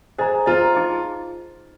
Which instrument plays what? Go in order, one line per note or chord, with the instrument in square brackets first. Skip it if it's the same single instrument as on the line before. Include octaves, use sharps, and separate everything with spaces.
[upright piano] G#4 [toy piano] C5 D#5 A#5
[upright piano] F4 [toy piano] C5 D#5 A#5
[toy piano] D#4 G#4 D#5